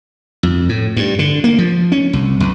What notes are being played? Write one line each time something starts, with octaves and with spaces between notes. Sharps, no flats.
F2
A2
G2
D3
A#3
F3
C#4
C2
B1